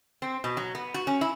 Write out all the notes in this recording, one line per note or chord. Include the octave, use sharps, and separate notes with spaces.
C4
B2
F#3
B3
F#4
C#4
E4